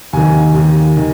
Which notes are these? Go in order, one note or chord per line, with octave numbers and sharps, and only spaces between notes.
D#2 D#3 G#5
D#2 D#3
D#3